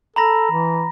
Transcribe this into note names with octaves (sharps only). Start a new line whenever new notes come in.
A4 A#5 B5 A#6
E3